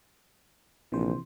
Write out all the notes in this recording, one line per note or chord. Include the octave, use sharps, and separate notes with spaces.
A#1 C3 E3 C5